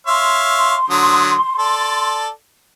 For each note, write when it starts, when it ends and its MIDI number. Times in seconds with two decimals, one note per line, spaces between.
0.07 0.75 73
0.07 0.75 76
0.07 0.75 77
0.07 2.18 84
0.90 1.34 50
0.90 1.34 54
0.90 1.34 87
1.58 2.29 69
1.58 2.29 74